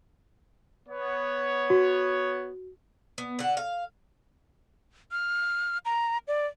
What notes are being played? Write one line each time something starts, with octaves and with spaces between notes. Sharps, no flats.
B3 C#5
F#4
B3
D3 F#5
F5
F6
A#5
D5